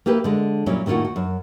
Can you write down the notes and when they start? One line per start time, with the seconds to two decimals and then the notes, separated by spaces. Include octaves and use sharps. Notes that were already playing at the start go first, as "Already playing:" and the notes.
0.06 A#3 E4 G4 B4
0.24 D3 G#3
0.66 A#2 F#3 G3 C#4 E4
0.86 A2 D#3 A#3 F4 F#4
1.05 F#4
1.16 F#2